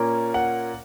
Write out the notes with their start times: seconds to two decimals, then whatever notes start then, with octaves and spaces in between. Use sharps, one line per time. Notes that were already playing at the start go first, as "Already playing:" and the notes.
Already playing: A#2 A#3 C#4
0.34 F#5